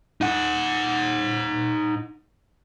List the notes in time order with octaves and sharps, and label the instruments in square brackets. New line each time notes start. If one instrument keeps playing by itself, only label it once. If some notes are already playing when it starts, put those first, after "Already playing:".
[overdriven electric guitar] D#4 F#5